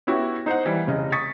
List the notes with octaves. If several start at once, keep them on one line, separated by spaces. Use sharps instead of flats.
B3 C#4 E4 F#4 G4
D#4 C5 D#5 F#5
E3 G3
F1 C#3 D#5
C#6 D#6 A6 B6 C#7